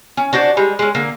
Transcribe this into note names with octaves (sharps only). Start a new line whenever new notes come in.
C#4
D4 F#4 C5 D5
G3 G#3
G#3 C#4
D3 A#3